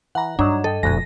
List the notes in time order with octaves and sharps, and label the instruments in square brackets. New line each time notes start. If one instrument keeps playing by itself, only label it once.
[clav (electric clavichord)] E3 [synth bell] F#5 A#5
[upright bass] G2 [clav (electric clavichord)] F#3 D#4 [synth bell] D4
[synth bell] A4 [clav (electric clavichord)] D#5 G5
[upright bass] F1 B2 [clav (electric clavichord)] D2 F#5 G#5 [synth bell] A#6